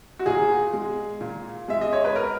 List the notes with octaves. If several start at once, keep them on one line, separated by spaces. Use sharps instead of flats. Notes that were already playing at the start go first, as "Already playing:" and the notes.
F#4
A#2 G#4
G#3
A#2
G#3 E5
D#5
C#5
B4
A#4